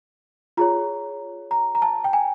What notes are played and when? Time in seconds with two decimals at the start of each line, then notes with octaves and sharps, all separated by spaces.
0.57 F4 G#4 C#5 A#5
1.51 A#5
1.75 A#5
1.82 A5
2.04 G5
2.13 G#5